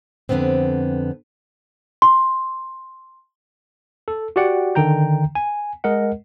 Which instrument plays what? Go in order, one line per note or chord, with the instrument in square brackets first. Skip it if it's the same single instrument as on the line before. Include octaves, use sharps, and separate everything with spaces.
[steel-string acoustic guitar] F2 G#2 D3 B3 C4
[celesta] C6
[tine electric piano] A4
F#4 G4 D5 F#5 G5
D3 D#3 G5 A#5 G6
G#5
G#3 A#4 D#5 F#5